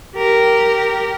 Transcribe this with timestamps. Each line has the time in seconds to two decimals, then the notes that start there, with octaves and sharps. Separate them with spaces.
0.16 G4 A#4